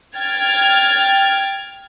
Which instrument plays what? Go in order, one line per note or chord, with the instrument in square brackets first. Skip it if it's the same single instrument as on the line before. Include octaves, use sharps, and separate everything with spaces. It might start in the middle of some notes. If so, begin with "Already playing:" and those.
[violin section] G5 F6 G#6 A6